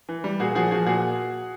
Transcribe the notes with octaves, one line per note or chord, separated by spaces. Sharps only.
E3
G3
A#2 F#4 G#4
F3 F#4 G#4
F3 F#4 G#4
A#2 F#4 G#4